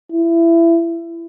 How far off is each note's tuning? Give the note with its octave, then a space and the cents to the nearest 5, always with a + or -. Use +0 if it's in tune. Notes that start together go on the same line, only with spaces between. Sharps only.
E4 +20